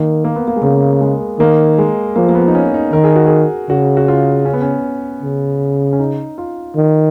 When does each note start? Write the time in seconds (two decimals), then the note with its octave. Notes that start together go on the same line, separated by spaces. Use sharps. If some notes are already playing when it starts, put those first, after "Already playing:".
Already playing: D#3 A#3
0.24 A#3
0.36 B3
0.48 A#3
0.56 G#3
0.63 C#3 A#3
1.01 G#3
1.39 D#3 A#3
1.78 G#3
2.16 F3 A#3
2.29 A#3
2.35 B3
2.48 D#4
2.55 C#4
2.74 D#4
2.93 D#3 A#4
3.04 G#4
3.16 F#4
3.26 G#4
3.69 C#3 F#4
3.97 F#4
4.08 F4
4.45 C#4
4.53 B3
4.62 C#4
5.22 C#3
5.93 C#4
6.00 D#4
6.38 F4
6.76 D#3